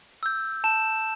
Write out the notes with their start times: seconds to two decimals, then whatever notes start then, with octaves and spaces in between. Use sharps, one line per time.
0.23 E6 G6
0.64 A5 E7